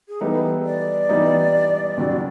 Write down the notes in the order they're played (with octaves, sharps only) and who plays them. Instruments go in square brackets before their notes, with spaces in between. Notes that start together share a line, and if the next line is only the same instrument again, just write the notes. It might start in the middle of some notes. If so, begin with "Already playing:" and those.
[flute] G#4
[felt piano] E3 G3 B3 D#4 [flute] A4
[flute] D5
[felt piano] E3 G3 B3 D#4
D#2 C#3 F#3